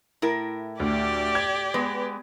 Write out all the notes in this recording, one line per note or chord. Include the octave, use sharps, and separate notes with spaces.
A2 E4 A#4
D2 G4 D5
G#6
G#3 B3